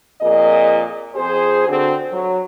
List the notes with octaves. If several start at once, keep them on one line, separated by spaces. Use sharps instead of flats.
F2 A#2 G#4 A#4 D#5
F2 G#4 C5
D3 C4 F#4
F#3